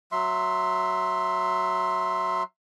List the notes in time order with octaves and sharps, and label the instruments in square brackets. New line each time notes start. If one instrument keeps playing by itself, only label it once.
[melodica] F#3 E5 C6